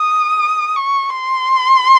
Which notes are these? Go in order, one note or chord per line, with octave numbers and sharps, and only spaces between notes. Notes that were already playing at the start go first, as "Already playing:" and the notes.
Already playing: D#6
C#6
C6